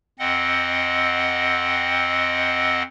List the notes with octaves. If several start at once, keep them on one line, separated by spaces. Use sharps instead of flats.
F2 C4 D#5 F#5